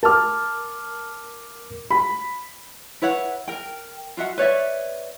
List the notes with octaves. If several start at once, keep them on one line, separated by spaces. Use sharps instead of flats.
A#4 A5 D6 F6
B5
E4 B4 C#5 F#5
A#4 G5
F4 F#4 E5 F#5
B4 C#5 D5 E5